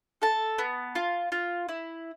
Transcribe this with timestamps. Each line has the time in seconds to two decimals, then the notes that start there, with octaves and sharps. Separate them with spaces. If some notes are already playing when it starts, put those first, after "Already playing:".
0.22 A4 A5
0.58 B3
0.95 F4
1.32 F4
1.69 E4